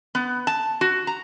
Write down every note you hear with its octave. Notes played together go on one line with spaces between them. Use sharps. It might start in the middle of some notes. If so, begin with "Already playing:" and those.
B3
A5
F#4
A#5